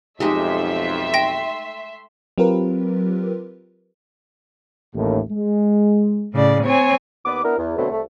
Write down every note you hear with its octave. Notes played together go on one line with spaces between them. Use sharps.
B1 F2 G#3 A3 D#4 G4 E5 C6
G5 A#6
F#3 C4 F4 G4 A#4 B4
A1 D#2 A2
G#3
A2 C#3 D5
C4 C#5 G#5
D#2 B3 B4 D6
B3 D4 E4 A#4
E2
B2 D3 F#3 A3 B3 C4
C2 A3